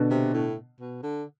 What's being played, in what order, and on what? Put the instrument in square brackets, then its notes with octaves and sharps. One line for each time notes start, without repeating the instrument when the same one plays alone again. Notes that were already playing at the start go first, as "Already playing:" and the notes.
Already playing: [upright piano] B2 D3
[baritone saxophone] C3
A2
B2
D3